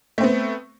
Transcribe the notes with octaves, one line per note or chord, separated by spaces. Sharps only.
A3 B3 C4